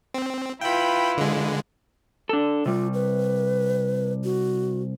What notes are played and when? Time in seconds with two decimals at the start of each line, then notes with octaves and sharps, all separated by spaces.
0.14 C4
0.61 E4 F4 B4 G5 B5
1.17 D3 G#3
2.29 D4 A4
2.66 C3 G3 F4
2.94 B4
4.24 F#4